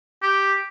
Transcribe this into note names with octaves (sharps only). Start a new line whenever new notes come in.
G4